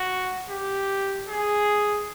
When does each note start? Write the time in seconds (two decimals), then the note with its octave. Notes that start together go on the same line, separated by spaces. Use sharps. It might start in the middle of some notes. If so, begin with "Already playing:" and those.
Already playing: F#4
0.49 G4
1.29 G#4